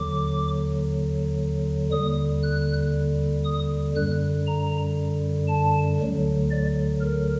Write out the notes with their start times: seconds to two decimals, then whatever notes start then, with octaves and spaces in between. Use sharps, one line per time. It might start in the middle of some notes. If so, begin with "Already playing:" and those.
Already playing: D#2 D3 F#3 D6
1.91 D#2 D3 G3 D#6
2.42 F#6
3.44 D#6
3.95 F#2 D3 G3 F#6
4.46 A#5
5.48 A5
5.99 D2 D3 F#3
6.51 D5
7.01 A#4